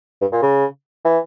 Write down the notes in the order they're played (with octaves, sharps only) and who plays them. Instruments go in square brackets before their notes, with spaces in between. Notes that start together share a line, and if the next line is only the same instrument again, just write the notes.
[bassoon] G2
A#2
C#3
E3